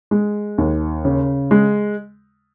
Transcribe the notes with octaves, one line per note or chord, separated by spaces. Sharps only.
G#3
D#2
C#3
G#3